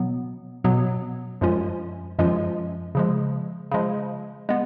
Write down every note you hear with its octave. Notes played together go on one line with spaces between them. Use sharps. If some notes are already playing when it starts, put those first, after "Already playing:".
Already playing: B2 F#3 B3
B2 F#3 B3
F#2 F3 G#3 C#4 F4
F#2 F3 G#3 C#4 F4
C#3 F3 G#3
C#3 F3 G#3
G#3 B3